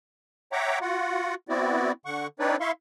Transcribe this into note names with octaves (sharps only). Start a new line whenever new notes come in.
C#5 E5 F#5 G5 A#5 D6
F4 F#4 F#5
B3 C4 E4 F#4 D5
D3 F#5 C#6
C4 D4 D#4 B4 C#5 D5
E4 E5 F5 C6 C#6